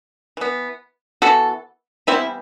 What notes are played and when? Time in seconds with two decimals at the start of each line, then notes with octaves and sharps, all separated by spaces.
0.37 E3 B3
1.22 E3 B3 F#4 A4
2.07 E3 G3 B3 C4 E4